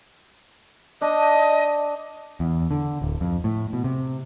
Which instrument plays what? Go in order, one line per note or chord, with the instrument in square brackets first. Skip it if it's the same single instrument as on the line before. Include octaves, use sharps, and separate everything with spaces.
[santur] D4 [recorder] D#5
[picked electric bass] E2
D3
D1
F2
A2
B2
C3